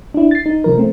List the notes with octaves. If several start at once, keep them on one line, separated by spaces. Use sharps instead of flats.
D4 E4
A6 C7
D#4
C3 F3 A#4
A3 C4